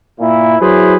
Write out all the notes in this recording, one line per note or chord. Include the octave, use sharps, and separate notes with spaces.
A#2 E4
F#3 E4 G#4 B4 C5